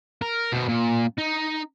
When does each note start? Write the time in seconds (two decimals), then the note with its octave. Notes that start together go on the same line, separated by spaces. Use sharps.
0.22 A#4
0.52 B2 C5
0.69 A#2
1.18 D#4